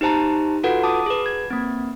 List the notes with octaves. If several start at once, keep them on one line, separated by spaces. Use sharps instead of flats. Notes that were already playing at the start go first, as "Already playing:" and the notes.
D#4 G4 C5 A5 A#5
F4 F#4 A4 B4 F#5
A5 D6 D#6
G#4 B4
G#6
A#3 C4